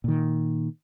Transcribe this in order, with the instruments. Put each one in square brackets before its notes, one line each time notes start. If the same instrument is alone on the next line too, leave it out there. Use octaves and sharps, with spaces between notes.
[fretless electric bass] A#2 D#3